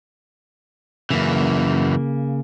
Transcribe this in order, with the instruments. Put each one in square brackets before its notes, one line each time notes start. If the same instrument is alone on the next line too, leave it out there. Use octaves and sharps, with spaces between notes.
[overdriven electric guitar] F#2 E3 [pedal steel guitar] C#3 A#3